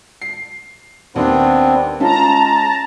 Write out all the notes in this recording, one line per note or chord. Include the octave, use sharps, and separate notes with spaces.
C7
D#2 B3 C4 D4
G#3 C#4 F4 A5 A#5